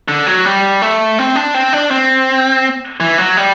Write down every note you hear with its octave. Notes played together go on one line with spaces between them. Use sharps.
D3
F#3
G3
A3
C4
D4
C4
D4
C4
E3
F#3
G3